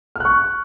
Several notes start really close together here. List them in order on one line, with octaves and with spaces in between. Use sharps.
F6 F#6 C#6